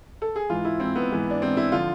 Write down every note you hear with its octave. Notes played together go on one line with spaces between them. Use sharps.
A4
G#4
G#2 E3 F4
E4
G#2 E3 C4
B3
G#2 E3
D4
G#2 E3 C4
E4
D3 F3 F4